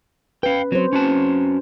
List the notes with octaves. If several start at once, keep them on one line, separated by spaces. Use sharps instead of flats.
C#4 B4 F5 G5
F#3 C4 C5
C#4 F#4 A5